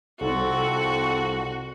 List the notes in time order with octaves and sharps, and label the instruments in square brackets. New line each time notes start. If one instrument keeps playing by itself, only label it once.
[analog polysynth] C2 [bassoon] F2 [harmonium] C4 A4 [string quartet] F#4